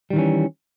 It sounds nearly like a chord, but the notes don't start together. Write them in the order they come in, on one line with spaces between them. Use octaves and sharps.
G3 D#3 E3 C#4